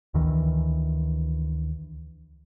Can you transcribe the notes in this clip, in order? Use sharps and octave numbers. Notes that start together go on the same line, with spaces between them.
D2 D#3 E3